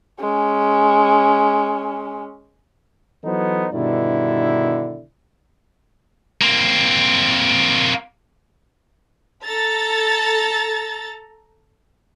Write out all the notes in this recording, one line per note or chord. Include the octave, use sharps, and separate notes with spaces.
G#3 C#4
E3 F#3 B3 D#4 A4 C5
G2 B2 D3 D#3 E4 D5
A#3 C4
A4 A#5 A6